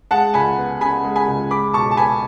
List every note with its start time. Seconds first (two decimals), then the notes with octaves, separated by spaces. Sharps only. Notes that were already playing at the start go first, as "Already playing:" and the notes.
0.11 G#3 F#5 A5
0.34 C#2 G#5 B5
0.58 B3
0.81 C#3 G#5 B5
1.04 G#3
1.16 G#5 B5
1.28 C#2
1.51 G#3 B5 D6
1.73 B1 A5 C#6
1.91 A5
1.97 B3 G#5 B5